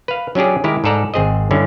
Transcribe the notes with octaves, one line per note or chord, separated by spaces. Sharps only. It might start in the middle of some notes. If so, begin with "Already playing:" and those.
B4 F5
F#3 C#4 D4 G4 G#4
D#3 G#3 E4 G4 A#4
G#2 G#4 A4 D5 A#5
G#1 C4 G#4 C5 D#5
G2 D3 C#4 E4